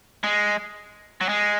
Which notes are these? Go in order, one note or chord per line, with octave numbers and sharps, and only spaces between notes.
G#3
F#3
G#3